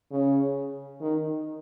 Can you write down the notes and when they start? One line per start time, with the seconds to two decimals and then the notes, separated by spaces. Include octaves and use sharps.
0.12 C#3
1.01 D#3